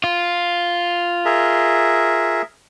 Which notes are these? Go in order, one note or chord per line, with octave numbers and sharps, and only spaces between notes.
F4
G#4 A#4 E5